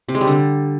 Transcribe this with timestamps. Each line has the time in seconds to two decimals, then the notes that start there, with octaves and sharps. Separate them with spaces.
0.08 C3
0.15 G#3
0.21 G3
0.27 D3